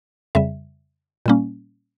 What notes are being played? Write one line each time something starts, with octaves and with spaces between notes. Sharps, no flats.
F2 C#3 G3 E5
A#2 G3 A#3 C#4